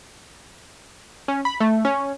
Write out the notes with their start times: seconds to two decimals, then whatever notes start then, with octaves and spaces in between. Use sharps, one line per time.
1.28 C#4
1.45 B5
1.60 A3
1.85 C#4